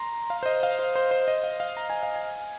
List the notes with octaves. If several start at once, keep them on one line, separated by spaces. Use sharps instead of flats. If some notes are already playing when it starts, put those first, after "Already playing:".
Already playing: A#5 C6
F5
C5
D#5
F5
C5
C5
C5
D#5
F5
F5
A#5
G#5
F5
G#5